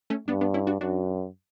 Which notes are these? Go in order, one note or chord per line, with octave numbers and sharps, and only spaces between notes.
A3 C#4
G2 B3 D4
B3 D4
C#4 E4
D4 F#4
F#2 D4 F#4